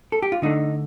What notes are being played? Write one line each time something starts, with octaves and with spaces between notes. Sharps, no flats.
A4
G4
F4
D3 A3 D4 D#4